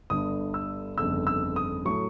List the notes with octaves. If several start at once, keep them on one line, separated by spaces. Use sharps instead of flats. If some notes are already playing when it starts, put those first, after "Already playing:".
G1 G2 D3 D#6
E6
G1 F2 C#3 E6
E6
D#6
A2 F#3 A3 C#6